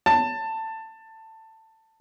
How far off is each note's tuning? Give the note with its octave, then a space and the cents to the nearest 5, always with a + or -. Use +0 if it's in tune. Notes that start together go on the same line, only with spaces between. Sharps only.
A5 +15